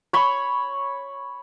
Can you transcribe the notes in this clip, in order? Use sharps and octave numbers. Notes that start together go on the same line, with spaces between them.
C#5 B5 C#6